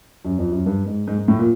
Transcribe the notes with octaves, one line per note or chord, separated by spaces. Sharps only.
F#2
F2
F#2
G2
G#2
G#2
G#2
A2
A#2